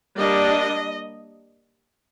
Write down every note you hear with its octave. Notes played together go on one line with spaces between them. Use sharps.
G3 A#3 D4 D#5